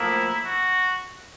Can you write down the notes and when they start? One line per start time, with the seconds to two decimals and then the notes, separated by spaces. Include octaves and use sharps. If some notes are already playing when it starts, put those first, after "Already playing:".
Already playing: A2 F3 A#3 E4
0.45 F#4